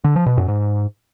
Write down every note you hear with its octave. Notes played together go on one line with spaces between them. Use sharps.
D3
F3
B2
F#2
G#2